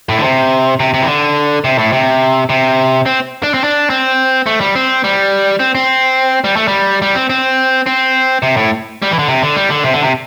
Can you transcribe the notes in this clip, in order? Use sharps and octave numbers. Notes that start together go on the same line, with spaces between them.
A2
D3
C3
C3
C3
E3
D3
C3
A2
C3
C3
C4
D4
C4
D4
C4
A3
G3
C4
G3
C4
C4
G3
A3
G3
G3
C4
C4
C4
C3
A2
G3
E3
D3
C3
D3
G3
D3
C3
D3
C3